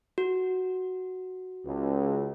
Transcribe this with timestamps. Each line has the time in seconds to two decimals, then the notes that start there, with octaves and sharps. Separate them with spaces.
0.18 F#4
1.65 C#2